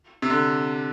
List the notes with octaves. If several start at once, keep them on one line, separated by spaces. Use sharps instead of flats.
C3
D3